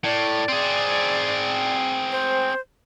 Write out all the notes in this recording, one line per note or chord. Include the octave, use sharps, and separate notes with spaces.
A2 D5
C4 G#4
C5